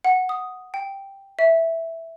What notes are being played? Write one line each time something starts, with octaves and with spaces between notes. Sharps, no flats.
F#5
D#6
G5
E5